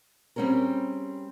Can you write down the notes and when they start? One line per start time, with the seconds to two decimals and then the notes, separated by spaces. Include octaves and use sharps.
0.36 G3 C4 C#4 G#4 A#4